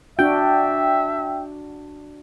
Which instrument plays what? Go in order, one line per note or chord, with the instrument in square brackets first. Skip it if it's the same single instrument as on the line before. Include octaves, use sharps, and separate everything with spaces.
[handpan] D4 F#4 [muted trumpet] E5 [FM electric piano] G5